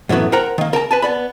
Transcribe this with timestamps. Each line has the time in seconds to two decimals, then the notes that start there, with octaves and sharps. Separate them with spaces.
0.09 F#2 A2 E3 F#3 B3
0.32 A#4 C5 F#5 G5 A#5
0.58 D#3 A#3
0.73 A#4 G5 A5 A#5
0.91 B4 G#5 A5
1.02 B3 D5 B5